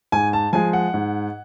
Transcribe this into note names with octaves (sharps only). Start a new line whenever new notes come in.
G#2 G#5
A5
F3 G#3 G#5
F#5
G#2